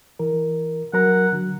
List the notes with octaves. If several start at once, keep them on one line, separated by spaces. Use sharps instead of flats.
E3 A#4
F#3 A#4 F#5 A#5
D3 F#3